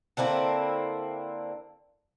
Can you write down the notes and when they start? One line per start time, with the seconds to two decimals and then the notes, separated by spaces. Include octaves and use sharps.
0.17 D3 A#3 C4 E4